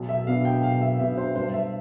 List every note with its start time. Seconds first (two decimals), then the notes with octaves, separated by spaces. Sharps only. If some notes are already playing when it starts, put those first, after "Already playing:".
Already playing: B1
0.09 E5
0.27 B2 B3 D4 F5
0.45 G5
0.63 B1 F5
0.81 E5
1.00 B2 B3 D4 E5
1.18 C5
1.36 G2 C5
1.54 E5